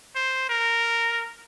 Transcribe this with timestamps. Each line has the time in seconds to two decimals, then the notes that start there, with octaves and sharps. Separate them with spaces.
0.16 C5
0.49 A#4